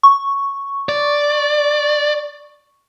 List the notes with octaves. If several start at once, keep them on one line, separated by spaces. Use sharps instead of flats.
C#6
D5